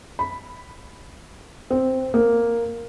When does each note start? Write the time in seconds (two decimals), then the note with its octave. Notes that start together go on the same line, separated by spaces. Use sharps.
0.19 B5
1.70 C4
2.14 A#3